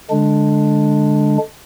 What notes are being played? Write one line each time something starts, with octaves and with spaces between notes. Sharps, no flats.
D3 G#3 D4